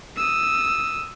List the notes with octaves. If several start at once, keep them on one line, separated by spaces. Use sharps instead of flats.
D#6 E6